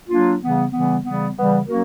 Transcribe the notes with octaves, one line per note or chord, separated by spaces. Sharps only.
F#3 A#3 D4 F4
C#3 E3 G3 B3
C#3 E3 G3 B3
C#3 E3 G3 B3
C#3 E3 G3 B3
F#3 A#3 C#4 F#4 A#4